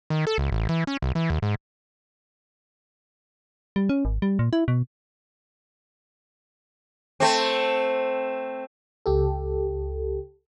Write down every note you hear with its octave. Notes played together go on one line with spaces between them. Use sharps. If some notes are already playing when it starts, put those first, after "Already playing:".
D#3
A4
C#2
A1
E3
C#4
C2
E3
D#2
G#2
G3
C#4
G#1
G3
A#2
E4
B2
A3 C4
C#2 G4 A4